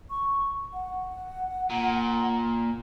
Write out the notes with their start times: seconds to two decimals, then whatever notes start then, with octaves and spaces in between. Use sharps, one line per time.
0.10 C#6
0.73 F#5
1.70 A#2